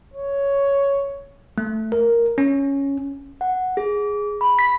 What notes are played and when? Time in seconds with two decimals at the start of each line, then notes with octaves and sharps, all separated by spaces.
0.14 C#5
1.58 A3
1.92 A#4
2.38 C#4
3.41 F#5
3.77 G#4
4.41 B5
4.59 B6